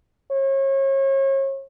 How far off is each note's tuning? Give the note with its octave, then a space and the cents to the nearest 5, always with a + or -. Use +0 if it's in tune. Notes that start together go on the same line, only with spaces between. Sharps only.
C#5 -35